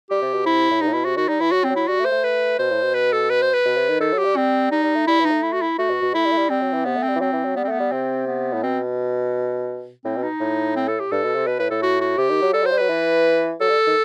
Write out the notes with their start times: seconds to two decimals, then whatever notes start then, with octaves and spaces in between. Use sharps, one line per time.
0.10 G3 G4
0.22 C3
0.34 B2
0.46 C3 E4
0.71 A2
0.81 G2 D#4
0.87 A2
0.93 B2 E4
1.05 C3 F#4
1.16 D#3 F#4
1.28 G3 D#4
1.40 E3 E4
1.52 F#3 F#4
1.64 C4
1.70 F#3
1.76 E4
1.88 G3 F#4
2.00 A3
2.05 C5
2.12 A3
2.24 B4
2.59 B2 C5
2.71 A2
2.82 B2
2.94 B4
3.12 A4
3.30 B4
3.42 C5
3.53 B4
3.66 B2
3.77 C3
3.89 D#3
4.00 D#3 A4
4.13 F#3
4.18 G4
4.24 G3
4.36 G3 C4
4.72 G3 D#4
4.84 G3
4.96 A3
5.07 G3 E4
5.20 E3
5.25 D#4
5.31 A3
5.43 E4
5.53 F#4
5.62 E4
5.79 A3 F#4
5.90 B2
6.02 B2
6.14 A3 E4
6.26 G3
6.32 A3
6.38 G3
6.50 G3 C4
6.61 F#3
6.73 E3
6.85 C3 B3
6.96 A3
7.03 C4
7.09 G3
7.16 E3
7.21 F#3 C4
7.33 E3
7.45 F#3
7.56 G3 B3
7.64 C4
7.68 A3 B3
7.80 G3
7.92 C3 C4
8.27 B3
8.53 A2
8.63 B2 C4
10.05 A2 C4
10.17 B2
10.23 D#4
10.40 A2
10.76 C4
10.88 A4
11.00 G4
11.12 G2 A4
11.23 B2
11.35 C3
11.47 B2 B4
11.59 A2 B4
11.70 A2 A4
11.82 F#4
12.01 F#4
12.18 C3 G4
12.30 D#3
12.42 F#3
12.53 G3 A4
12.63 F#3
12.66 C5
12.72 G3
12.77 F#3 B4
12.89 E3
13.60 F#3 A4
13.69 G3
13.87 D#3